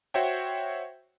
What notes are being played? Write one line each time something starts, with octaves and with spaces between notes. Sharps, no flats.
F#4 C5 C#5 E5 G5